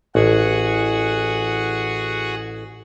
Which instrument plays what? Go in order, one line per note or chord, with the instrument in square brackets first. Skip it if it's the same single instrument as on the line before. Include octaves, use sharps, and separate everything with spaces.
[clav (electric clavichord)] A1 [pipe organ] F#4 G#4 F#5